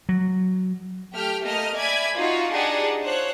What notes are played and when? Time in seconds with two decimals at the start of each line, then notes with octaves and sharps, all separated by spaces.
0.09 F#3
1.12 A3 G4 G5 F6
1.44 A3 A#3 D#5 F6
1.75 D5 E5 G#5 B5 G#6
2.15 D#4 F4 F#4
2.50 D4 D#4 G4 G#4 F#5
3.02 F4 C5 C#5 F#6